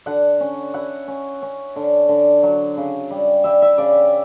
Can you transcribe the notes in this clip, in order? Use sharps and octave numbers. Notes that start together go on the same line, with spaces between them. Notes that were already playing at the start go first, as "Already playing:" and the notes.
D3 F#5
C#4
E4 F#5
C#4
C#4
D3
D3
F#3
C#3
G3
G3 E5
E5
C#3 D5